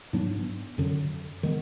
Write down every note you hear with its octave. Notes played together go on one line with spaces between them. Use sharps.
G#2 F#3 B3 D4
F#2 D3 F#3
D#3 G#3 B3